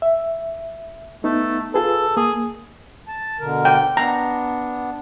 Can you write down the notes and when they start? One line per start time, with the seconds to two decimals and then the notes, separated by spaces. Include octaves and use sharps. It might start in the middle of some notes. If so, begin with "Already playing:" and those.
0.02 E5
1.24 A3 B3 D#4
1.74 F4 G#4 A4 B4
2.17 A#3 G#4 D#6
3.08 A5
3.40 B2 D3 A#4
3.65 G5
3.97 B3 D4 A#5